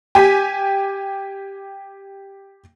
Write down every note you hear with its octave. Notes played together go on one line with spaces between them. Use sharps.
G4 G#5 B6